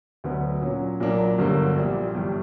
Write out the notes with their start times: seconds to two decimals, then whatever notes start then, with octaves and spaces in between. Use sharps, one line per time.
0.24 D2 D3 F#3 B3
0.61 A#2 F#3 C#4
1.00 B1 A#2 F#3 A#3 D4
1.38 G1 G2 D3 F#3 A#3
1.76 A#1 A#2 G3
2.14 G1 G2 E3 G3